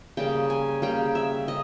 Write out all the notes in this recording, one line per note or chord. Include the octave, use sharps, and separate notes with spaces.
C#3 G3 A#3 G5
G#5
C#3 G3 A#3 G5
E5
C#3 D#5